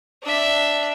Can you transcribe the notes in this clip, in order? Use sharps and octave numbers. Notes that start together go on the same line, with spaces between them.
D4 E5